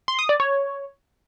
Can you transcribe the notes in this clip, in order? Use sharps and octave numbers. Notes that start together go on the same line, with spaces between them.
C6
D#6
D5
C#5